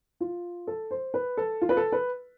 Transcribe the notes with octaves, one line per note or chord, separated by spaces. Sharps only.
F4
A4
C5
B4
A4
F4
B4
A4
B4